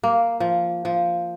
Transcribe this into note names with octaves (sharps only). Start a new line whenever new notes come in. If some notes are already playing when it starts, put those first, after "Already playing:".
A#3
F3
F3